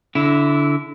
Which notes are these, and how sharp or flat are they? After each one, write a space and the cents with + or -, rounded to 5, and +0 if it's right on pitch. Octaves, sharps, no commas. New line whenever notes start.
D3 -25 E4 +0